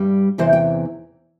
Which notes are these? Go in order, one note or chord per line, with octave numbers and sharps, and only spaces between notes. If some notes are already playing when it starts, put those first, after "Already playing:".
Already playing: G2 G3
E2 C3 E3 C5
G5